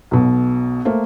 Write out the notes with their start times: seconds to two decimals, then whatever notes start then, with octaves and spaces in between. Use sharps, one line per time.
0.11 B1 B2
0.85 A3 A#3 C5